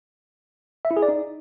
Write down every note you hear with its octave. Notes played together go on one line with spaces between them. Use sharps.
E5
E4
G#4
D5
D#4